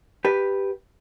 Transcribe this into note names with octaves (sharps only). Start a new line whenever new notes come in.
G4 B4